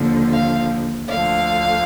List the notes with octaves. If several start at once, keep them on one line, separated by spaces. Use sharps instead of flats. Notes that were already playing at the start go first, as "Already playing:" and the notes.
Already playing: D#2 D3 F3
F5
D2 D3 F3 F5